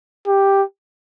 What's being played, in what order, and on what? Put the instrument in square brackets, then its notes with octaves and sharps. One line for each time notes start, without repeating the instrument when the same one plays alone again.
[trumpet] G4